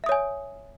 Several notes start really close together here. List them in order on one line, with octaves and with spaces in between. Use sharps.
E5 D#6 C#5 G#5